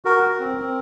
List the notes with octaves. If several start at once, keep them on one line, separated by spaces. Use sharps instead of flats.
F#4 A#4
F#4
C4
C4